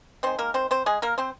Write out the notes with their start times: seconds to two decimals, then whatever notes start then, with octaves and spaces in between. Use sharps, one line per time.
0.23 D#3 G#3 C4 C5
0.39 A#3 A#4
0.54 C4 C5
0.71 C4 C5
0.86 G#3 G#4
1.02 A#3 A#4
1.18 C4 C5